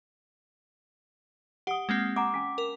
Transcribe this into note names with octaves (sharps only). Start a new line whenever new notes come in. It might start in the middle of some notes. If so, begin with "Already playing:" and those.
G4 F#5 D#6
G#3 A#3 C4
F#5 G#5 A#5 D6
C#4 G#5 B6
A#4